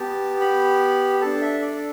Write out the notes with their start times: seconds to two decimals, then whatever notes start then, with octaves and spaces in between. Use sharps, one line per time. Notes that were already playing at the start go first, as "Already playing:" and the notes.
Already playing: B3 G4 A5
0.41 B5
1.21 D4 A4 A5
1.42 E5
1.62 D5